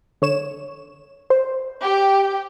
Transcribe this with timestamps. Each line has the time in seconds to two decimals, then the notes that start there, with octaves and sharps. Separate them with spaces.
0.22 D3 C#5 E7
1.30 C5
1.82 G4